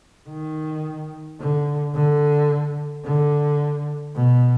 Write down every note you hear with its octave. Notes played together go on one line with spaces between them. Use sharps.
D#3
D3
D3
D3
B2